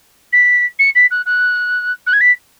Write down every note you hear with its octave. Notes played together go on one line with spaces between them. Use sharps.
B6
C#7
B6
F#6
F#6
F#6
G#6
B6